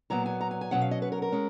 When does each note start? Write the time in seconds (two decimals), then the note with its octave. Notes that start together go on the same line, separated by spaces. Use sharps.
0.10 A#2 F#3 B3 A#5
0.26 G#5
0.41 A#5
0.51 G#5
0.61 G#5
0.71 B2 F#3 C#4 F#5
0.82 F5
0.91 D#5
1.02 B4
1.12 A#4
1.22 A#4
1.32 G#3 C#4